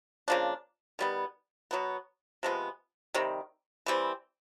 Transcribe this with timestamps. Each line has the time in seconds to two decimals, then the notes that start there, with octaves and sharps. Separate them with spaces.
0.28 C#3 F3 A#3 D4
0.99 D#3 G3 B3
1.71 B2 F#3 B3
2.43 C3 F3 G#3 B3
3.14 C3 D#3 G3
3.86 E3 G3 C4